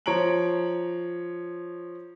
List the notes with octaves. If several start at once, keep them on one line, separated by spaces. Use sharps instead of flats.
F3 C#5 A#5 D7 F#7